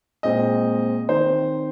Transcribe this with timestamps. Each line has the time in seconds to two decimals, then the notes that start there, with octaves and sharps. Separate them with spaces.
0.23 A#2 G#3 C4 D#5
1.09 D#3 C4 C5